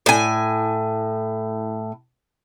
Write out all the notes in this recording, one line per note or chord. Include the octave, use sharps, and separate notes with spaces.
A2 G#5